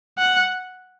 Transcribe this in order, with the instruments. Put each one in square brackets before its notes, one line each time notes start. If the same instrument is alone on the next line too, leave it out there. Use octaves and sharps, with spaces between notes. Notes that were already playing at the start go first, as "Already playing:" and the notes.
[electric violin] F#5